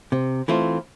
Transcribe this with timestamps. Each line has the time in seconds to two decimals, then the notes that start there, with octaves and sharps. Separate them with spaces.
0.12 C3
0.48 E3 A3 C4 F4